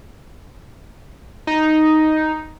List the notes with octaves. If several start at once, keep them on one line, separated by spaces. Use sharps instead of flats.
D#4